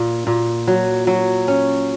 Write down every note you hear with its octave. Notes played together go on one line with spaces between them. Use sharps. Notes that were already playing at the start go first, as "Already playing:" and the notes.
Already playing: A#2
A#2
F#3
F#3
C#4